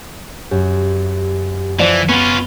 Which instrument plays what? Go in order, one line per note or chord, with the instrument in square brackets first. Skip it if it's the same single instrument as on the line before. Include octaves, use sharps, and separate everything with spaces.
[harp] F#2 [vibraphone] G4
[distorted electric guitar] E3 [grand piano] F3 D5
[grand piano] B3 F7 [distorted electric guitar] C#4 F4 [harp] D#7